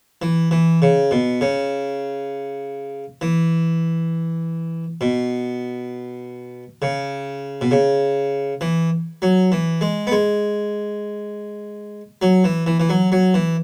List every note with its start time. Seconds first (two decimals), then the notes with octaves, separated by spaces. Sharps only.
0.22 E3
0.51 E3
0.82 C#3
1.11 B2
1.41 C#3
3.21 E3
5.01 B2
6.82 C#3
7.61 B2
7.71 C#3
8.61 E3
9.22 F#3
9.52 E3
9.81 G#3
10.07 B3
10.12 G#3
12.22 F#3
12.44 E3
12.66 E3
12.80 E3
12.89 F#3
13.12 F#3
13.34 E3